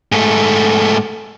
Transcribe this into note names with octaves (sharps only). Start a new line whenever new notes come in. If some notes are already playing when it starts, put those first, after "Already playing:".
G#2 A3